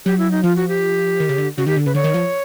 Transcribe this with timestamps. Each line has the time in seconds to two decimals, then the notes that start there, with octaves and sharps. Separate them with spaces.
0.05 F#3 G4
0.19 E4
0.31 D#4
0.44 F3 F4
0.56 F#4
0.69 G4
1.20 D#3
1.29 C#3
1.38 D3
1.57 C#3 F#4
1.66 D#3 G4
1.76 D3
1.86 C#3 B4
1.95 D3 C#5
2.04 D#3
2.14 F3